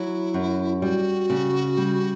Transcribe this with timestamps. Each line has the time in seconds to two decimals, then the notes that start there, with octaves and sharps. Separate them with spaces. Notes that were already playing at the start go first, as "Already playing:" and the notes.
Already playing: F#3 E4
0.34 F#2
0.82 G3 F#4
1.30 C#3
1.77 G3